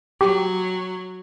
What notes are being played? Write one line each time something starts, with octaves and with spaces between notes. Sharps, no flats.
F#3 G4